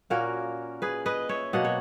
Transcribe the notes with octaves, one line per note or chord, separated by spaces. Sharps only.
A#2 A#3 C#4 F#4 A#4
G#4 B4
B4 D#5
C#5 E5
B2 F#3 A#3 D#5 F#5
C#5